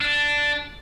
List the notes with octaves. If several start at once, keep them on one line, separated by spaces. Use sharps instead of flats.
D4